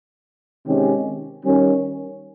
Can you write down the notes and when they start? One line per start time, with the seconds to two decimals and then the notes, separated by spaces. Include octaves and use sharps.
0.65 C3 D#3 G#3 C#4 G4
1.44 D#3 G3 C#4